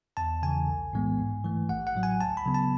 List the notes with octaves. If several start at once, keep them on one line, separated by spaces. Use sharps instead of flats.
E2 A5
C#3 E3 G#5
B1
A2 E3 G#3 B3
G#2
E3 A3
A1 F#5
F#5
A2 F#3
G#5
D2 A5
B5
C#3 F#3 B3
A5